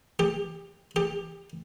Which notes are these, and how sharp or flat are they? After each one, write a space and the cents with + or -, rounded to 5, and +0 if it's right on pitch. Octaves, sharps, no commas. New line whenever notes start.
G4 +20
G4 +20